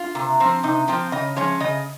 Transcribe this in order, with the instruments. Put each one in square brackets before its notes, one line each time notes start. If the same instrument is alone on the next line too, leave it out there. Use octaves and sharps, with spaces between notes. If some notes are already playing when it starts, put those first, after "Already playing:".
Already playing: [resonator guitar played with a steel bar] F4
C3
F3 C4
C3 D#4
F3 C4 F4
C#3 D#5
F3 G#3 C#4 C#5
C#3 D#5